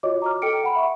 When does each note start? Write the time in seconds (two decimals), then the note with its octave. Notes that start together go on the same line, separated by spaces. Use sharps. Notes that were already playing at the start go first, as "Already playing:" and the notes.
0.03 F4 F#4 C#5 D#5 D6
0.22 A#5 D6 F6
0.42 A4 G5 C#7 D7
0.64 F#5 B5
0.76 E5 C#6